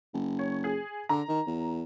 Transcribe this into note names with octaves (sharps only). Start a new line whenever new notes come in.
F#1
C#5
G#4
D3 A#5
D#3
E2